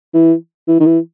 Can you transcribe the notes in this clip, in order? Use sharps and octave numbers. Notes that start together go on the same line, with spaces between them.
E3
E3
D#3
E3